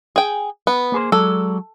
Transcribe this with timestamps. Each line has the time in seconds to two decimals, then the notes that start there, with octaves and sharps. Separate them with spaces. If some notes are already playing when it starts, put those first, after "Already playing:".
0.16 G#4 G5
0.67 B3
0.92 A#3 G#4 C5
1.12 F#3 G#3 A4 D5